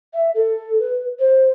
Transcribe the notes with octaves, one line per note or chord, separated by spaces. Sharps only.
E5
A4
B4
C5